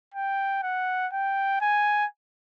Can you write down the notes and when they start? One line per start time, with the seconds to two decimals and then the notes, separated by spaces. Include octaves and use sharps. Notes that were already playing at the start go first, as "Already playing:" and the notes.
0.14 G5
0.63 F#5
1.13 G5
1.61 G#5